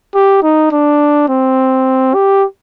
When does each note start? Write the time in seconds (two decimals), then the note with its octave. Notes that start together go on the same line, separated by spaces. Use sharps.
0.15 G4
0.43 D#4
0.72 D4
1.29 C4
2.14 G4